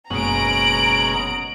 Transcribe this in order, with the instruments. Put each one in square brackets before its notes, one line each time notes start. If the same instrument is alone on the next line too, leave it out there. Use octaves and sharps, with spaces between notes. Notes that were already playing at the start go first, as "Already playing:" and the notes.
[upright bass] F#1 [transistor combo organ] B2 G#3 C#4 [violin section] A#5 D7 [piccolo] F#7